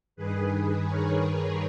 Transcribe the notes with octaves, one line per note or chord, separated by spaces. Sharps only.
G2 D#3 G#4 B4
A#4 C#5
G#4 B4